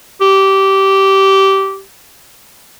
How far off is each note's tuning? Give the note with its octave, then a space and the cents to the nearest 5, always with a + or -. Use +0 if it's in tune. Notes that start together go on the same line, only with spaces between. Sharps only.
G4 -15